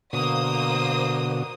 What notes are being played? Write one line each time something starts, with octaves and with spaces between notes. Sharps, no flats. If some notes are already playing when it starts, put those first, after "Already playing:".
B2 D3 A#3 F#4 C5 D#6